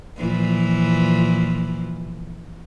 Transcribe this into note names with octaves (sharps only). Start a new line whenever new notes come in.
A#2 E3 F3